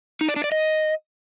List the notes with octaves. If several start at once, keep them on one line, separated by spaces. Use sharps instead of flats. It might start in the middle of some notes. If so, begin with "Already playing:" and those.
D#4
D5
D4
D5
D#5